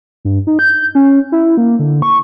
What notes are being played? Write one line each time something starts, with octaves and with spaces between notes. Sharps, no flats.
G2
D#4
G6
C#4
E4
A#3
D3
C#6